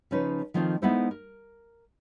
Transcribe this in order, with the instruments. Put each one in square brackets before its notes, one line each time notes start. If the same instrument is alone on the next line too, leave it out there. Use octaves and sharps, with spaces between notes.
[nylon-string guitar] C#3 F3 C#4 D#4 B4
D#3 F3 A3 C4 D#4 F4
G#3 B3 D#4 E4 A4 C5
A#4